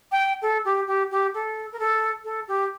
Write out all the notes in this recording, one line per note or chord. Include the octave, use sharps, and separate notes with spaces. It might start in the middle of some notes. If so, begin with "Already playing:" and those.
G5
A4
G4
G4
G4
A4
A#4
A4
A4
G4